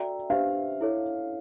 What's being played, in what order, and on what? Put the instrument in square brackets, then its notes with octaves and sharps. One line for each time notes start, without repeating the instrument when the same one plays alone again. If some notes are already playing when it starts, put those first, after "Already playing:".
Already playing: [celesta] F#4 A4 D5 G5 A#5 [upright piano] E5
[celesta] D4 G4 C5 E5 [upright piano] F5
[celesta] E4 A4 C#5